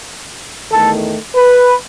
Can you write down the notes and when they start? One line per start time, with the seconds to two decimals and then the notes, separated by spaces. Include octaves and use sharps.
0.71 E2 D#3 A3 A4
1.36 B4